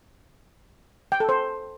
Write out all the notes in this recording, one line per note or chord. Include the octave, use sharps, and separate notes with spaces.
G5
A4
C5